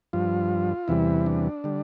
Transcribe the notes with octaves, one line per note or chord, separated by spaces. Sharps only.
G2 F3 F4
E2 C3 E3 G3 E4
D4
D3 G3